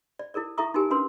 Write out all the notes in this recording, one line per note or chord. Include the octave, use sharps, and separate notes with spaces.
D5
E4 A4 A#4 D5
E4 A4 E5 A#5 C#6 D#6
D#4 F#4 G4 A#4 G#5
C#4 D4 F#4 A#4 B4 C6